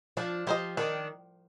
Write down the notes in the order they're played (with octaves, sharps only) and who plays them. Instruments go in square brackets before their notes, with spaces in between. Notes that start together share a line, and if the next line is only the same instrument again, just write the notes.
[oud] F3 [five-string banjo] D4
[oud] F3 [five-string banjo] G4 C5 D#5
[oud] D#3 [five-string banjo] D4